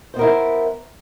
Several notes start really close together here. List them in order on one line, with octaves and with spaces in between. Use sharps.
C5 B3 A#4 E4